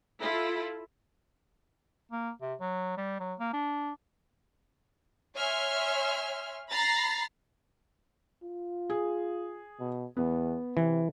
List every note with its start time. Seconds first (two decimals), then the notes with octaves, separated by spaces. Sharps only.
0.20 E4 F4 A4
2.12 A#3
2.42 C3
2.61 F#3
2.98 G3
3.20 F#3
3.40 A#3
3.53 D4
5.35 C#5 E5 G#5 C6 F6
6.70 A#5 B5 A6 A#6 C7
8.43 F4
8.90 G#4
9.80 B2
10.17 E2 B3
10.77 C3 E3